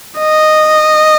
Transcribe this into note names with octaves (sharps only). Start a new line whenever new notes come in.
D#5